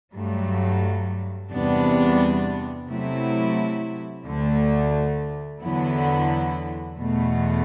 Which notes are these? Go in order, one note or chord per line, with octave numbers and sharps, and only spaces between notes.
G2 F#3 A3
E2 C3 G3 B3 D4
C3 F#3 A3 E4
D2 D3 A3
E2 D3 F#3 B3 E4
E2 B2 A3